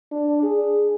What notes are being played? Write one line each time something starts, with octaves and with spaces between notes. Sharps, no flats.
D4
G#4